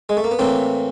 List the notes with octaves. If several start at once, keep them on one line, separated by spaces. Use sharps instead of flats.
G#3
A3
A#3
B3
A2 E3 A#3 C4